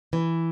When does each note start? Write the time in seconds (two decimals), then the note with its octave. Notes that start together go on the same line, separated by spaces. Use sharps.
0.13 E3